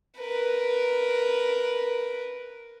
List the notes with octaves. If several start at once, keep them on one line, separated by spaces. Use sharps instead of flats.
A#4 B4